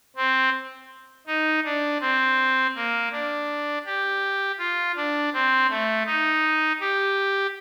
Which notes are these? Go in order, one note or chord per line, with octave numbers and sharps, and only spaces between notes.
C4
D#4
D4
C4
A#3
D4
G4
F4
D4
C4
A3
D#4
G4